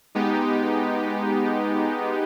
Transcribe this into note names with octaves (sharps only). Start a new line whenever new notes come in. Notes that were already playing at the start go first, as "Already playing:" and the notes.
G#3 B3 D#4 G4